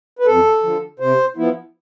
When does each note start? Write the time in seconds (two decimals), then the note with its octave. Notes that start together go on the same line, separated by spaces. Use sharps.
0.19 B4
0.26 F2 A4
0.63 D3 F3
0.99 C3 C5
1.37 F3 B3 E4